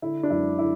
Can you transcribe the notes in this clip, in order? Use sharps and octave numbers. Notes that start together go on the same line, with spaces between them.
D3 E4
D4
F#2 E4
D3 E4